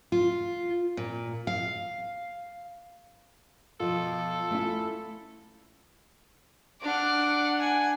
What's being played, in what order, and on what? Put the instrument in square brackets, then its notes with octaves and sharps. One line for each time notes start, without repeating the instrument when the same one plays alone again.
[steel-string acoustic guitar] F4
A#2
F5
[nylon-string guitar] B2 F3 [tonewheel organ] F4 [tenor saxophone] A4
[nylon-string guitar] A3 C#4 E4
[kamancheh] D4 F#5 [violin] D6 F6
[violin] G#5